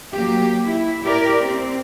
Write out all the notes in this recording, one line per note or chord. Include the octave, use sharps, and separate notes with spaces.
F#3 A#3 G4
E4
E4 G4 A#4 D5
C4